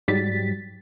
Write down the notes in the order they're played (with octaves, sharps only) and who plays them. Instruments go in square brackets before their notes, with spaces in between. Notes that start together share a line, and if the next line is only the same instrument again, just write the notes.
[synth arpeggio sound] G#2 F#3 G3 A6 B6